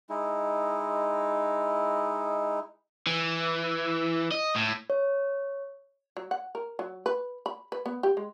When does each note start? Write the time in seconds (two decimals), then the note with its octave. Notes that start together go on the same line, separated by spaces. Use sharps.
0.10 G#3 D#4 E4
3.07 E3
4.31 D#5
4.55 A2
4.90 C#5
6.17 F#3
6.31 F#5
6.55 A#4
6.79 F#3
7.06 B4
7.46 B5
7.72 B4
7.86 B3
8.03 G4
8.17 G#3